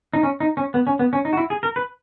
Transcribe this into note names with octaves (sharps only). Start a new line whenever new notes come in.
D#4
C#4
D#4
C#4
B3
C#4
B3
C#4
D#4
F#4
E4
G#4
A#4
B4